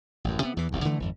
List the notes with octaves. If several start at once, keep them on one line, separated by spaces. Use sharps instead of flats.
A1 F#2
C3 B3
E2 E3
E1 B1 E2
D3 E3 A3
G#1 F2